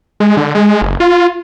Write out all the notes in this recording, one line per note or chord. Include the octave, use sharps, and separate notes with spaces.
G#3
D3
G#3
F#1
F4